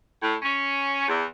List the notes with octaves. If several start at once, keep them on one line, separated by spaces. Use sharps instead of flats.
A2
C#4
E2